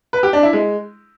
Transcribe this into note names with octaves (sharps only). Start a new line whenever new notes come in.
B4
G4
D4
E4
G#3